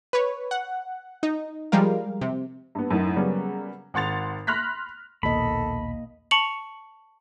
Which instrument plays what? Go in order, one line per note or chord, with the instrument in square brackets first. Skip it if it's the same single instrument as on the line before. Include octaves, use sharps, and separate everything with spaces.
[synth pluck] B4 C#5
F#5
D#4
F3 G3 G#3 A#4 F5
C3
[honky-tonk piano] G2 B3
F#2 A2 D#4
C#3 F#3 G3 A#3 B3 C#4
G#1 F#5 C6 A6 F7
B5 C6 F6 F#6 A#6 B6
[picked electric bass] A#1 D#2 B2 [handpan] A#3 D#5 [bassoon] A4 [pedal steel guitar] B5
[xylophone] A5 C#6 C#7 F7 F#7